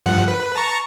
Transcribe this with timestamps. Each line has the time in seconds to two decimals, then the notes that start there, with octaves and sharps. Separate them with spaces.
0.06 G2 F3 F#5
0.28 B4
0.56 A5 A#5 C#6